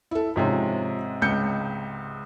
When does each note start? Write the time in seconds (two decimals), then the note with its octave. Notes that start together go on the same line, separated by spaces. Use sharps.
0.11 E4 A4
0.36 G#2 C3 F3 C#4
1.22 C#2 G6 C#7